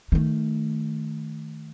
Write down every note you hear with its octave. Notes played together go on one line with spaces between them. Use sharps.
D#3 A3